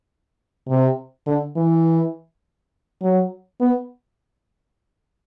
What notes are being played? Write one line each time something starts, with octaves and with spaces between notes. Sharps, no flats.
C3
D3
E3
F#3
B3